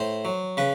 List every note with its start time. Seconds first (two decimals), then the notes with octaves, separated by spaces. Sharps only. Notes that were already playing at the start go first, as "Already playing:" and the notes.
Already playing: A2 C5
0.25 F#3
0.57 C#3 B4